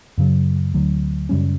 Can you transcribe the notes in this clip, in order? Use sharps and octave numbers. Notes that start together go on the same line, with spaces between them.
F#2 C#3 F#3
D2 D3 F#3
F#2 C#3 G3 C#4